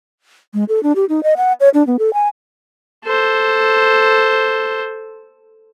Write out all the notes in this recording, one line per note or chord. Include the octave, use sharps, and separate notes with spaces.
G#3
A4
D4
G4
D#4
D#5
F#5
C#5
D4
B3
A4
G#5
A4 C5